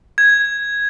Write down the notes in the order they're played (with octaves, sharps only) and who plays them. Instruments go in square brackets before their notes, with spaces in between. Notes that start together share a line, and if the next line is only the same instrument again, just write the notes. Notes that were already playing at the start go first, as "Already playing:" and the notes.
[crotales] G#6